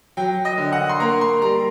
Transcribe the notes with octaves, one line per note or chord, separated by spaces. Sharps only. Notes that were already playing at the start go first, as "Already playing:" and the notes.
F#3 G5
D#5
D3
F#5
C6
A#3 A#5
C6
G3 A#5